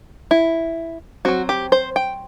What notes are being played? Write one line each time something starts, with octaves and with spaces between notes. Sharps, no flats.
E4
F#3 C4 F#4
G4
C5
G5